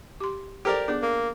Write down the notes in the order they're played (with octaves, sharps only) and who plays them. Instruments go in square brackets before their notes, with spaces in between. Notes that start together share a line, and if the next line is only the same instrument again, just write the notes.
[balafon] G4 C6
[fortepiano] G4 A#4 D5 [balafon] A4 C5
[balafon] B3 G#4 [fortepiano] D4
[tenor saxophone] A#3